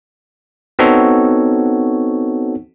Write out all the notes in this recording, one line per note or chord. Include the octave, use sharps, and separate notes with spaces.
B3 C4 D#4 F#4 A4 C#5